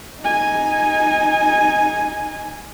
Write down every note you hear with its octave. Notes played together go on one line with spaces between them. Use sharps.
D#4 G#5